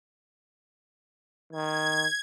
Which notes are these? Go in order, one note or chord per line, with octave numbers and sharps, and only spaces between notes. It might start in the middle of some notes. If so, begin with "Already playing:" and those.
D#3 G#6